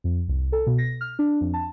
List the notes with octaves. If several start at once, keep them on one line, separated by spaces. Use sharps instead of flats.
F2
C2
A4
B2
A#6
F6
D4
F2
A5